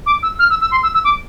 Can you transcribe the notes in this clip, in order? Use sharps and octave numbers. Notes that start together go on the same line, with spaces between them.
D6
E6
F6
E6
E6
C6
E6
E6
D6